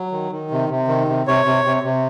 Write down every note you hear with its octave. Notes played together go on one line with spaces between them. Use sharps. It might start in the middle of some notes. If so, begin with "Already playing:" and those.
Already playing: F#3
D#3
D#3
C3
C3
D#3
C3
C3 C#5
C3
C3
C3